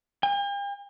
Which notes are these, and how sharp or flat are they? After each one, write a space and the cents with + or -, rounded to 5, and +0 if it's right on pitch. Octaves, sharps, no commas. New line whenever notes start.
G5 +45